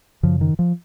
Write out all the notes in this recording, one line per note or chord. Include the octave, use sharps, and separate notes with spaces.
F#2 C#3 F3
D#3
F3